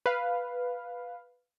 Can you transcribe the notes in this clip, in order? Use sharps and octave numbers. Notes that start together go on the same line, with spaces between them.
B4 F5